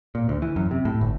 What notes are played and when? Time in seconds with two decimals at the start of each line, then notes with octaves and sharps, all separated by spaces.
0.15 A#2
0.29 D2
0.42 E3
0.56 F#2
0.71 C3
0.85 A2
1.01 G1